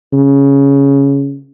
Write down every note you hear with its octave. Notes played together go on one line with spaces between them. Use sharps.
C#3